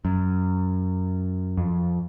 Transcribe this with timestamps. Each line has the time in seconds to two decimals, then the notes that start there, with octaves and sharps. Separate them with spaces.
0.05 F#2
1.57 F2